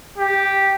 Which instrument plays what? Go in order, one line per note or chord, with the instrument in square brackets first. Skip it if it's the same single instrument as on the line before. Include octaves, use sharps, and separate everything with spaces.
[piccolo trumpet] G4